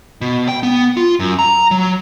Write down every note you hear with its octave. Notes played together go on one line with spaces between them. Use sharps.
B2
G5
B3
F4
F#2
A#5
F#3